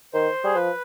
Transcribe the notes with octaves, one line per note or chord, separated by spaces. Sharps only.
D#3 C5
G3 G#4
F3 B4